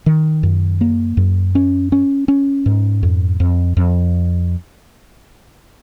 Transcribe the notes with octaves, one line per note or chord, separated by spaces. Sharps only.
D#3
F#2
A#3
F#2
C#4
C#4
C#4
G#2
F2
F2
F2